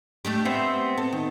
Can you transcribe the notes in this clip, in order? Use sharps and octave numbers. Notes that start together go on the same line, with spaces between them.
A3 D4 G4
B3 C4 C5 E5
A4
D#3